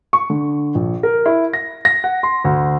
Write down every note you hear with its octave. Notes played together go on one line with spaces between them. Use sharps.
C#6
D3
A#1
A#4
E4
A#6
A#6
F#5
C6
D2